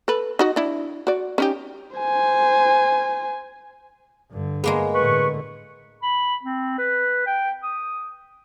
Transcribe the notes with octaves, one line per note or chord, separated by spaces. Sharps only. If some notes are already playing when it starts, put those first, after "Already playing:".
A4 B4
D#4 F#4 D#5
D4 E4
F#4 D5
C#4 D#4 G4
C5 G#5
G2 D3
G#3 A#3 B3 G#4
A2 D3 B4 C#6
B5
C4
B4
G5
D#6